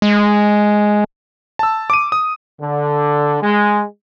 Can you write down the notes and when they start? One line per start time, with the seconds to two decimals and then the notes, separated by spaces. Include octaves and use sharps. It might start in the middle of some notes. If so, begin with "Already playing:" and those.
0.02 G#3
1.59 A5 E6
1.90 D6 D#7
2.12 D#6
2.60 D3
3.42 G#3